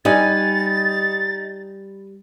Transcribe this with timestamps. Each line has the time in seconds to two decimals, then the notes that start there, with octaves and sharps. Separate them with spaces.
0.05 G3 D#4 B4 G#5 A6